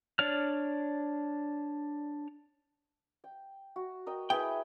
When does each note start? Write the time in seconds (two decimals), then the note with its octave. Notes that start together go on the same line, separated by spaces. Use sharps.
0.19 D4 C#5 D5 F6
3.24 G5
3.76 F#4
4.06 A#4 D#5 G5
4.30 E4 G#4 B4 G5